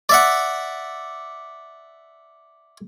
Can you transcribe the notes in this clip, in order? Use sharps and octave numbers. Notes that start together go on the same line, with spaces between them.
D5 E5 F#5